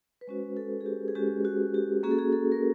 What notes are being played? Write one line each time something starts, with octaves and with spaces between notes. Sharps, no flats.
B4
G#3 C#4 F#4 C5
A4
G#4
G4
G#4
G#3 C#4 F#4 G4
F#4
G4
A#3 C#4 F#4 G#4
A4
G#4
A4
A#4